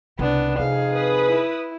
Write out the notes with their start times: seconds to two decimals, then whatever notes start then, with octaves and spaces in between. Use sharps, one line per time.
0.19 C2 C#3 B3 D4
0.59 F2 C3 D#4 G#4 F5
0.92 B4 D#6
1.28 E4